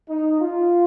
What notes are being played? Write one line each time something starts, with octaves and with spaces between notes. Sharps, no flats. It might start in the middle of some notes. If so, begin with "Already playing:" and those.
D#4
F4